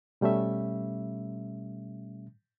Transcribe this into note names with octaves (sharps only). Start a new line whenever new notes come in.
B2 G3 A3 C#4 E5